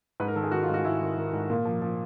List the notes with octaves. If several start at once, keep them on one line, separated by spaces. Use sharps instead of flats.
G#2 B4
A#4
D#3 A4
G#4
D#3 F#4
F4
G#2
F#4
G#2 E4
D#3
D#3
G#2
A#2 A#3
F3
F3